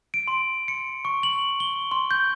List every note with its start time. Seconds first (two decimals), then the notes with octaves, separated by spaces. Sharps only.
0.14 D7
0.28 C6
0.68 C#7
1.05 C#6
1.23 F#7
1.60 G7
1.91 C6
2.11 G6